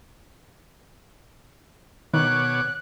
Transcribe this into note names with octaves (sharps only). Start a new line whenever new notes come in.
B2 D#3 C#5 D6 F#6